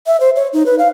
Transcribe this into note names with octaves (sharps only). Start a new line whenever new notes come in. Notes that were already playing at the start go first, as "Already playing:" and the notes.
E5
C5
C#5
D#4
B4
F5